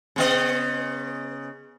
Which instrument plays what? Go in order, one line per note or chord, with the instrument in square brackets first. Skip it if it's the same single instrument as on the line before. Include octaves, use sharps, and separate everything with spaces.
[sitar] C#3 B3 D#5